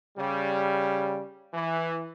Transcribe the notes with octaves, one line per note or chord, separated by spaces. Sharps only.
C#3 G3
E3